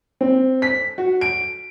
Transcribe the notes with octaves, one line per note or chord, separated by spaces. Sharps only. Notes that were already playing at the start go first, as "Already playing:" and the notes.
C4
B6
F#4
D7